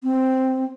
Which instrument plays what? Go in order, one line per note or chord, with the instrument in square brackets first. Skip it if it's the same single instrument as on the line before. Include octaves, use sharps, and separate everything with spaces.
[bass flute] C4